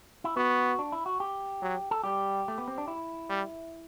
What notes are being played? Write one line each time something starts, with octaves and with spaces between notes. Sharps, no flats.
E4
B3 F#4
D4
E4
F#4
G4
F#3
A4
G3 G4
A3
B3
C4
D4
E4
G3